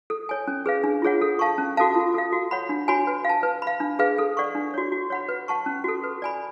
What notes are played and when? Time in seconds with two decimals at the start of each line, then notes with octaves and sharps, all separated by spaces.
0.10 A4
0.29 C#5 G#5
0.48 C#4
0.66 G#4 B4 F5
0.84 D4
1.02 F4 G#4 C#5 F#5
1.21 A4
1.39 F5 A5 C#6
1.58 C#4
1.77 F#4 A4 F5 A5
1.95 F4
2.14 A4 F5
2.32 F#4
2.51 C#5 F#5 B5
2.69 D4
2.88 F#4 C#5 G#5 B5
3.07 B4
3.25 F5 A5
3.43 B4
3.62 F5 B5
3.80 D4
3.99 G#4 B4 F5
4.18 A4
4.37 D5 F#5 C#6
4.55 D4
4.74 F#4 C#5
4.92 F#4
5.10 C#5 F#5 B5
5.29 B4
5.48 F#5 A5 C#6
5.66 C#4
5.84 F#4 A4
6.04 B4
6.22 D5 G#5 B5